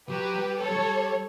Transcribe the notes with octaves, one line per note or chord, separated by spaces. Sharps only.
F#3 G4 B4
G3
G3 A4 C#5
F#3
G3